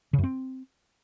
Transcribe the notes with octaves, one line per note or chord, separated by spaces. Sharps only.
C#3
F#2
C4